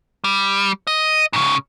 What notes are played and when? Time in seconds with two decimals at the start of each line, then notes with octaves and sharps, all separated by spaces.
0.24 G3
0.87 D#5
1.33 G#2 C#3